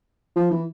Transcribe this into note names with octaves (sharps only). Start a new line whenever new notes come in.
F3
E3